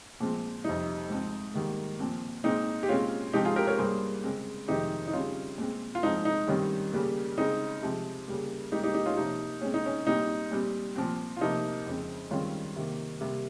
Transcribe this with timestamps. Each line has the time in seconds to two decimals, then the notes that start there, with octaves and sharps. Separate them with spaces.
0.20 A#2 F3 G#3 C4
0.64 F2 C3 G3 D#4
1.10 G#2 F3 C4
1.54 G#2 D#3 G3 A#3
1.99 A#2 F3 C4
2.44 A#2 G#3 C4 D#4
2.83 G4
2.89 A#2 G#3 C4 C#4 F4
3.33 G#2 F3 C4 D#4 G4
3.45 F4 G#4
3.56 G4 A#4
3.67 A#4 C#5
3.78 G2 G3 A#3 G#4 C5
4.23 C#3 G#3 C4
4.68 F2 C3 D#3 G#3 C4 D#4 G4
5.07 D#4
5.13 C#3 G3 C4 C#4 F4
5.58 A#2 G#3 C4
5.95 F4
6.03 G#2 F3 C4 D#4
6.25 D#4
6.48 G2 D#3 G3 C4 C#4
6.93 C#3 G3 A#3
7.37 C#3 G#3 C4 D#4
7.82 C3 F3 G#3 C4
8.27 C#3 G3 A#3
8.72 G#2 G3 A#3 D#4 G4
8.83 D#4 G4
8.94 D#4 G4
9.06 C#4 F4
9.17 C3 F3 A#3 D#4
9.61 A#2 G#3 C4 C#4
9.74 D#4
9.86 C#4
10.07 A#2 G3 C4 D#4
10.51 A#2 G3 C4
10.96 A#2 F3 C4
11.37 F4
11.41 C3 F3 A#3 D#4
11.86 F2 C#3 G#3 C4
12.31 G2 D#3 G#3 C4 C#4 F4
12.76 C3 D#3 A#3
13.21 C3 G3 A#3